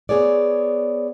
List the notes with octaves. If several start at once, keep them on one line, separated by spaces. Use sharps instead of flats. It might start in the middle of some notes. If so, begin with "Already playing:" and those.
B3 G#4 C#5 D5